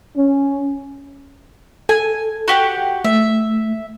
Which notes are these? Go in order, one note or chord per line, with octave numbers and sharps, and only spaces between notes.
C#4
A4 G#5
F#4 G4 F#5
A3 E5